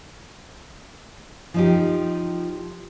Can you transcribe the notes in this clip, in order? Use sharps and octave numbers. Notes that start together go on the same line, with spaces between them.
F3 D#4 G4